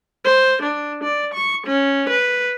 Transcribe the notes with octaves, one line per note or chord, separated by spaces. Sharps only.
C5
D4
D5
C#6
C#4
B4